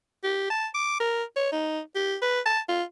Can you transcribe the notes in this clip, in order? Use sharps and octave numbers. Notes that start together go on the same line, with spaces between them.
G4
A5
D6
A#4
C#5
D#4
G4
B4
A5
F4